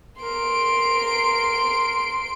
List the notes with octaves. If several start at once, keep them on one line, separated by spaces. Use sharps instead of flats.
A#4 C6 D7